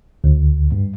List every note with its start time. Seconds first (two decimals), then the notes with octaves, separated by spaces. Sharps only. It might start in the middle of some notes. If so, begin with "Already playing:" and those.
0.24 D2
0.72 G2